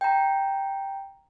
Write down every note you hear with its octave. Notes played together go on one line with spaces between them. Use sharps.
G5 A#5